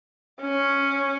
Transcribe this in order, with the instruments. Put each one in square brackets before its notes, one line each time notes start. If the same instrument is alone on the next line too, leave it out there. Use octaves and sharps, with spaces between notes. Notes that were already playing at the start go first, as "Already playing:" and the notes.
[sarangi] C#4